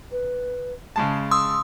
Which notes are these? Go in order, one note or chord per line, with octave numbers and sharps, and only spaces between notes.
B4
C#3 G#3 A5 B5
C6 D#6 E6